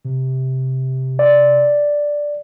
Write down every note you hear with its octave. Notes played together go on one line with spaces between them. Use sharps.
C3
D5